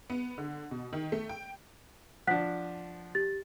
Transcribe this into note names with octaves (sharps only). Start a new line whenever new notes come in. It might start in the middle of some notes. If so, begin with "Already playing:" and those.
B3
D3
B2
D#3
A3
G5
F3 D4 F#5 F#6 B6
G4 A6